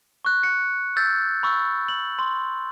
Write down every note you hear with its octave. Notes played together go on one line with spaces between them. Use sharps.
C#6 F#6
C#7
E6 G6 A6
B5 C#6 E6
F#7
C6